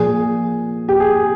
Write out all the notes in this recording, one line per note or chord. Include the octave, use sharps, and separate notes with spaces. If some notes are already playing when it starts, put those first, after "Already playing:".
Already playing: A#2 F3 G#4
G4
G#4